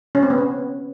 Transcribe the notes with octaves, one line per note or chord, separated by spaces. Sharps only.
C#4
C4
B3
C#4